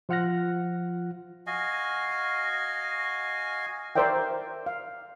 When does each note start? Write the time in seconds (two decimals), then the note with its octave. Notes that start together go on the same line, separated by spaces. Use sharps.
0.09 F3 F4 F#5 F6 F#6 A#6
1.47 F#4 D#5 F5 G#5
3.96 A#4 C5 D5 E5 G5
4.66 F5